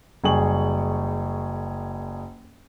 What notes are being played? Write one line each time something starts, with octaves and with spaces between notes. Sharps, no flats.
F#1 G3 G#4 G5 C#6 F#7